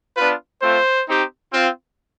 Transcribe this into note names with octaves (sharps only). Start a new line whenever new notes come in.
B3 D4 F4 B4
A3 C4 F4 C5
C4 D#4 G4
C4 F4